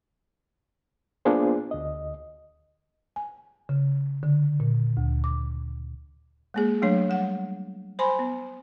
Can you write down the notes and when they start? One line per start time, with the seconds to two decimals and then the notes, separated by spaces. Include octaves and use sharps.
1.25 A#3 B3 D4 F4 G#4 C5
1.71 D2 D#5
3.16 G#5
3.69 C#3
4.23 D3
4.60 A#2
4.97 D2
5.24 D6
6.54 G#3 A#3 G#4
6.82 F#3 A3 D4 C#5
7.09 G3 F#5
7.99 C5 G#5 B5 C6
8.19 B3